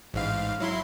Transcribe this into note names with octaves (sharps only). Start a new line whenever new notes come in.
A1 G#2 F5
F#3 E4 C6